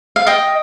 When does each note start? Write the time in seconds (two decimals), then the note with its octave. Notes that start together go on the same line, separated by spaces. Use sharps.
0.16 F5
0.27 D#5 G5